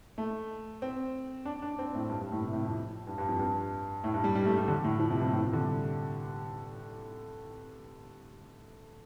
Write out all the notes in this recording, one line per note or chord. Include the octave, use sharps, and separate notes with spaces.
A3
C4
D4
D4
C4
A2
G2
G2
A2
C3
A2
F2
G2
G2
F2
G2
A2
G2
G3
G3
A3
G3
D3
A2
F3
C3
G2
A2
C3
D3
G3